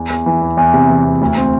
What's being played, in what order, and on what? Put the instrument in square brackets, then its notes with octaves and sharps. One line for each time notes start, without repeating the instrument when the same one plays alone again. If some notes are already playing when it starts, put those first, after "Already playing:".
Already playing: [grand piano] E2
E2
E3
E2
E2
C3
E3
E2
D2
C4